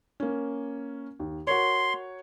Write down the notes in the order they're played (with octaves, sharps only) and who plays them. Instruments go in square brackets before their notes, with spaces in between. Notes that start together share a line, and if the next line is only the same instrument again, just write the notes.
[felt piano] A#3 C#4
D#2
[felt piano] F#4 A#4 C#5 [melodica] C6